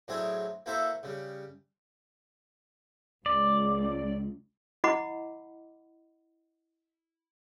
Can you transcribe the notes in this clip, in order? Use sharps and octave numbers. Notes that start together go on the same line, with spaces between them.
A2 F#3 C4 D4 E4 G#4
A#3 E4 F#4 A4 C5 E5
C#3 G3
C#2 D5
E4 D#5 F#5 B5 D6